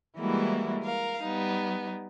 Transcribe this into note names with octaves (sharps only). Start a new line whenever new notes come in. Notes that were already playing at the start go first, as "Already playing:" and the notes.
E3 G3 G#3 A#3 E4 F#4
A#4 F5
G3 B3 D#4